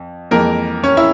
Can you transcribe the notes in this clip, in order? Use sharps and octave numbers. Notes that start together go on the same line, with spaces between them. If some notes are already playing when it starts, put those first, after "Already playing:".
Already playing: F2
F2 E3 G#3 A#3 A#4
C#4 C#5
E4 E5